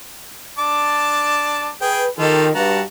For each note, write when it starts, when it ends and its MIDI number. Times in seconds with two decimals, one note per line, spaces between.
0.59 1.69 62
0.59 1.69 81
0.59 1.69 86
1.81 2.04 68
1.81 2.08 71
1.81 2.04 79
2.18 2.50 51
2.18 2.48 65
2.18 2.48 67
2.18 2.48 69
2.55 2.82 43
2.55 2.81 66
2.55 2.81 81
2.55 2.81 82